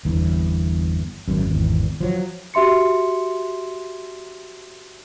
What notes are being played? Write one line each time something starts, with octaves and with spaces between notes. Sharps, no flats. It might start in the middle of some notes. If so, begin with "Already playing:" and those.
G1 E2
G#1 F#2
G#1 E2
F3 F#3
F#4 G4 E5 C6 C#7